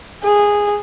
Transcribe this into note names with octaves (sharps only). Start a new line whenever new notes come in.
G#4